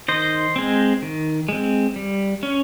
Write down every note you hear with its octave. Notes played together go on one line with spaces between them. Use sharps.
D#3 C5 D#5
G#3 C4
D#3
G#3 C4
G3
C#4